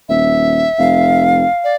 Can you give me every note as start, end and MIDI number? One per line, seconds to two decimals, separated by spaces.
0.09 0.66 27
0.09 1.23 76
0.79 1.44 29
0.79 1.75 77
1.64 1.76 74